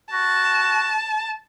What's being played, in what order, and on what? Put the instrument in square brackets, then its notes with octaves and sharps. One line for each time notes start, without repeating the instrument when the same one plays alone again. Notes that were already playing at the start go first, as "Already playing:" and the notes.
[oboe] F#4 [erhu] A5